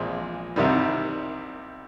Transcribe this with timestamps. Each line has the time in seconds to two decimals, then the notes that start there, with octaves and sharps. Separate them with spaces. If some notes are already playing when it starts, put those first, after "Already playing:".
Already playing: A#1 A#2 G#3 C4
0.56 C2 C3 D#3 G3